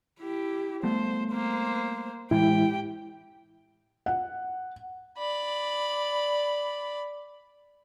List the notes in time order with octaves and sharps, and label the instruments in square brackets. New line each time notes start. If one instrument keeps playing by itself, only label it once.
[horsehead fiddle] E4 G4
[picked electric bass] G3 A3 B3 [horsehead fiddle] C5
[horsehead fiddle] A#3 C5
[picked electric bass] A2 E3 G#3 [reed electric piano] E4 [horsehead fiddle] G4 G5
[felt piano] F#5
[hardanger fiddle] D5 B5